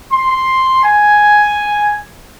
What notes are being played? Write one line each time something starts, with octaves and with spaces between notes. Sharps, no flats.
C6
G#5